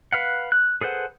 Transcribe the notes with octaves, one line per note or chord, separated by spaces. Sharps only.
B4 F5 F#5
F#6
G#4 A4 B4 C5 F#5